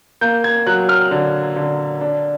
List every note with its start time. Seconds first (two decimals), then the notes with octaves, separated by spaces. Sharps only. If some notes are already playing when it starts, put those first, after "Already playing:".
0.21 A#3 G6
0.44 G#6
0.66 F#3 F#6
0.89 F6
1.11 D3
1.56 D3
2.01 D4